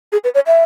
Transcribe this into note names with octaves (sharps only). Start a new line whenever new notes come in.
G#4
B4
C#5
E5